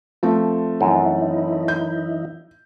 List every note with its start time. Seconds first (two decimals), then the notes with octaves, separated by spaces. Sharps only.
0.23 F3 A3 C4
0.81 F#2 E3 D#4 E4
1.68 G6